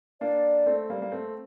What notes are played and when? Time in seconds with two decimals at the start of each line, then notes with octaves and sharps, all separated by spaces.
0.21 A#3 D4 D5
0.66 A3 C4
0.90 G3 A#3
1.02 A#3
1.12 A3 C4